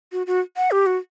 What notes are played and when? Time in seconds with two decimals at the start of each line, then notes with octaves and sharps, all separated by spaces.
0.12 F#4
0.27 F#4
0.57 F#5
0.71 G4
0.86 F#4